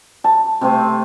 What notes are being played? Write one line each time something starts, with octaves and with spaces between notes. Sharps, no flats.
A5
C3 A3 C4